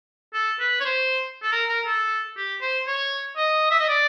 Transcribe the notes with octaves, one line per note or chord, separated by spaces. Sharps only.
A4
B4
C#5
C5
A4
A#4
A#4
A4
G4
C5
C#5
D#5
E5
D#5
D5